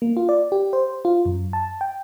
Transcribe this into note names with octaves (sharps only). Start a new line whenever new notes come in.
A#3
F4
D5
G4
C5
F4
F#2
A5
G5